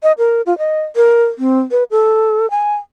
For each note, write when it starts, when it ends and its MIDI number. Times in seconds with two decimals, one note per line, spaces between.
0.03 0.12 75
0.18 0.42 70
0.46 0.57 65
0.58 0.82 75
0.96 1.24 70
1.38 1.59 60
1.71 1.84 71
1.91 2.49 69
2.51 2.75 80